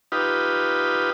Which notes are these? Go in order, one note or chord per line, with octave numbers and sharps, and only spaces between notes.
D#4 F4 G4 B4